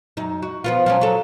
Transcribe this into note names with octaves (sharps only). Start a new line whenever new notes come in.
F#2 D#4
F#4
F3 B3 F4
F3 F#3 C#4
F#3 A4